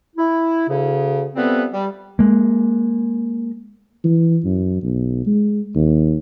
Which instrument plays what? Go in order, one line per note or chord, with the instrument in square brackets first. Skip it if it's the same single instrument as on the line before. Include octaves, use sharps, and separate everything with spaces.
[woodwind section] E4
D2 C#3
F3 G3 A3 B3 C4 B4
G3
[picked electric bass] G#3 A#3
[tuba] E3
F#2
B1
G#3
D#2